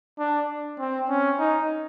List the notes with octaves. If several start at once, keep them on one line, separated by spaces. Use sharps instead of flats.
D4
C4
C#4
D#4